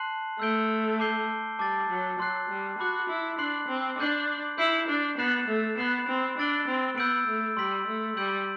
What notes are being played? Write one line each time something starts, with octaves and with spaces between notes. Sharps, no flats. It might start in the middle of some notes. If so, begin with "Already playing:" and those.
Already playing: A5 C6 F#6 C7 F#7
A3 E6 G6 D7 G7
A5 D6 G6 C7 G7
G3 A5 D6 A6
F#3
F#3 C6 F#6 C7
G3
F#4 B5 D6 F#6
E4
D4 C6 F#6 C7 F#7
C4
D4 D6 G6 C7 F#7
E4 G6 C7 E7
D4
B3 F#6 A6 C7 E7
A3
B3 B5 F#6 C7 E7
C4
D4 E6 A6 D7 G7
C4
B3 E6 G6 D7
A3
G3 C6 E6 B6 F#7
A3
G3 E6 G6 D7 F#7